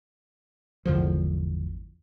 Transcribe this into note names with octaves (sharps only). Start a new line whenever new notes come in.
G#1 E2 D3 F3